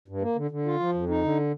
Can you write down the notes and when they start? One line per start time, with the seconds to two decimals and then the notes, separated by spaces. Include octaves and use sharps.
0.08 G2
0.22 A#3
0.36 D3
0.51 D3
0.66 F4
0.80 F3
0.94 F2
1.09 D#4
1.23 D3